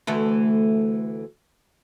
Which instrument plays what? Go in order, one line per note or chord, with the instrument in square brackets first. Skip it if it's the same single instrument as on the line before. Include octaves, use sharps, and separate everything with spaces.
[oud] D2 E3 A3